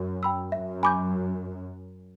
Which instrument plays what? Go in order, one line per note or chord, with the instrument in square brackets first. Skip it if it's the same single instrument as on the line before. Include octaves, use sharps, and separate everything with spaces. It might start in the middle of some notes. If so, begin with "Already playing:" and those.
Already playing: [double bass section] F#2
[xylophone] G5 B5 E6
[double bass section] F#2 [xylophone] E5
[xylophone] G#5 B5 D6 G6